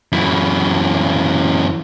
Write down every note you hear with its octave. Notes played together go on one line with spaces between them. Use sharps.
F#2 E3